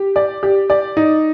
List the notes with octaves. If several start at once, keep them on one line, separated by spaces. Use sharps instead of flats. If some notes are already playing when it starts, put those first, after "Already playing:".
Already playing: G4
D5
G4
D5
D#4